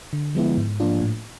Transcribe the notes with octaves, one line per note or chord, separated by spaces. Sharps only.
D3
F3 G#3 B3 E4
G#2
F3 A#3 D4 F4
A2